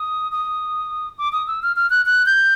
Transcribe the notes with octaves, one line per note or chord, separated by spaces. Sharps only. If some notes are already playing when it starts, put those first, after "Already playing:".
Already playing: D#6
D#6
D6
D#6
E6
F6
F6
F#6
F#6
G6